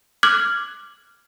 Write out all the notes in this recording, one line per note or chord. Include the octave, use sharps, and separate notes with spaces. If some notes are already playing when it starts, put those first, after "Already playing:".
D6 F6 F#6 G#6 F#7